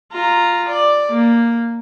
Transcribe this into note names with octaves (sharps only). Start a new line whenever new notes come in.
F4 A#5
D5
A#3